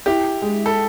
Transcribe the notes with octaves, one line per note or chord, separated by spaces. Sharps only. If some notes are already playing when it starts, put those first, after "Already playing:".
E4 G4
G#3
A4